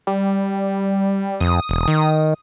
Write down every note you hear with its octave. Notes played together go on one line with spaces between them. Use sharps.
G3
F2 D#6
E1
D#3